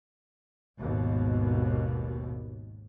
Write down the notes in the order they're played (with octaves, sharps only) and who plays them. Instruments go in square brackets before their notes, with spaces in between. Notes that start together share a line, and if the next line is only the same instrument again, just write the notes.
[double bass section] G#1 D#2 B2